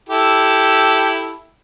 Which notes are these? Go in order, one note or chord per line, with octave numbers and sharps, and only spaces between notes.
E4 G4 A4